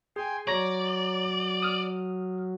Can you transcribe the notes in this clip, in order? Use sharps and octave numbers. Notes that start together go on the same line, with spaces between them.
G#4 G5 G#5 C6
F#3 C#5 D5 A#5 A#6
D#6 F6